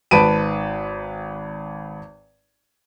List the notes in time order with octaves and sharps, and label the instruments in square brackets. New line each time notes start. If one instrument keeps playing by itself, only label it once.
[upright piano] G#1 B4 A5 B5 D7 D#7